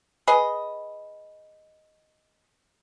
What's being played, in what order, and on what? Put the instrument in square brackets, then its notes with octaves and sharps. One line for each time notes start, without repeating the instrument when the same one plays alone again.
[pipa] G#4 B4 D#5